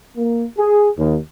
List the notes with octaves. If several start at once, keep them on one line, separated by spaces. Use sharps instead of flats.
A#3
G#4
D#2